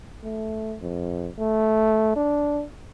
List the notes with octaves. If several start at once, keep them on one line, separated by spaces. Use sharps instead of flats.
A3
F2
A3
D4